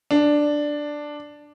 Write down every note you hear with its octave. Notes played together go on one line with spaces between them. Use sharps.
D4